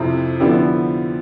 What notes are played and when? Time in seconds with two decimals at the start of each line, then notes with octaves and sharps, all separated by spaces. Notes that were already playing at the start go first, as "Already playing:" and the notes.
Already playing: F2 C3 F3 C4 E4
0.40 D3 F3 B3 E4 G4